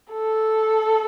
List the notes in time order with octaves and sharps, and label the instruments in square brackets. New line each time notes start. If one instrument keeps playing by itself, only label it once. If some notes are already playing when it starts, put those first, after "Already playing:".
[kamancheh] A4